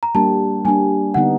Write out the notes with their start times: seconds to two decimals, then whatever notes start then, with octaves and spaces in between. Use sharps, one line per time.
0.03 A#5
0.15 G3 A#3 D4 G4 A5
0.65 G3 A#3 D4 G4 G#5
1.14 D3 G3 B3 D#4 F#5